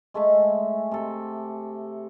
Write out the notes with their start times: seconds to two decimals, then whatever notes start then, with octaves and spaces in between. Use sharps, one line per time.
0.14 G#3 A3 E5 A5
0.91 C3 A4